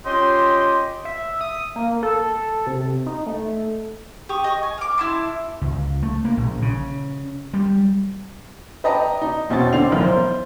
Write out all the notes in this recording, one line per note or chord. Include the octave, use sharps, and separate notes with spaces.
C#4 F4 G4 D#5 C6
E5
D#6
A#3
A4
C3
D#4
A3
G4 C#6 D#6
D#5 C#6
G#5
F5 D6
E4 A5 C6
C#2
A3
A#3
A#1
C#3
G3
B4 D5 D#5 G5 A5 A#5
D#4
E1 B2 C4 C#4 C#5 A6
D3 C4 D5 C7 F7
B1 A2 E3 B3 A#4
C5